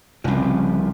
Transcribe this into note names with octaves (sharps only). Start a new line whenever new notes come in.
F1 C2 C#3 F3